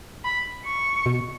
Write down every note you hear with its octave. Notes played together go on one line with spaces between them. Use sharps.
B5
C#6
B2